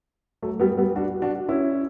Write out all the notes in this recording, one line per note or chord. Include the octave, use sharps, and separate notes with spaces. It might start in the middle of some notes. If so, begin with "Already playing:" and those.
F#3 A3
G3 B3
G3 B3
D4 F#4
D4 F#4
C#4 E4